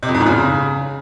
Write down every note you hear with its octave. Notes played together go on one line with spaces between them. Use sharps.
C3
F2
G#2
E2
C#3